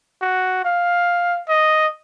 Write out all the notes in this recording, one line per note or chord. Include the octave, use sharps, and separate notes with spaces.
F#4
F5
D#5